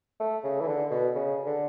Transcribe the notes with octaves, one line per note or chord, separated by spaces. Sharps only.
A3
C#3
E3
D3
B2
C#3
D3